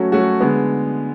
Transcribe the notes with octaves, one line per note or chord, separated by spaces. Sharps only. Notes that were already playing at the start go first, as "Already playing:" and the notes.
Already playing: F#3 A3 C#4 F#4
F#3 A3 C#4 F#4
D3 G#3 B3